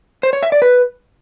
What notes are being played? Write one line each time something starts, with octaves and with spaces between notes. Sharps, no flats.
C5
C#5
E5
D5
B4